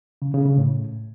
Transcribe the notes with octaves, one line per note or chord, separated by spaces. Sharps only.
C#3
C#3
C#3
A2